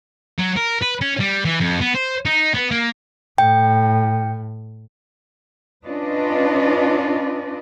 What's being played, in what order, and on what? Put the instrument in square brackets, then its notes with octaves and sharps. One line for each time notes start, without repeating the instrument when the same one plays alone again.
[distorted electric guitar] F#3
A#4
B4
C#4
G3
E3
F2
B3
C5
D#4
B3
A#3
[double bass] A2 [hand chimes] G5
[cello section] C#4 D4 F4 B4 D5 D#5